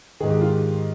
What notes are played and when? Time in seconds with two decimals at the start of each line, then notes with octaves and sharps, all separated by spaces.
0.20 G#2 D#3 G#4
0.30 G4
0.41 F4
0.52 G4